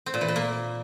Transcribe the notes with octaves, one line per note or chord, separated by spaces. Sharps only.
C4
A#2
E3
A#2
A#3